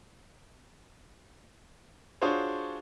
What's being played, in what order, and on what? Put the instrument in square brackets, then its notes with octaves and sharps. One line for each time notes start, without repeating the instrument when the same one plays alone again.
[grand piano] D4 F4 F#4 G#4 C5 C#5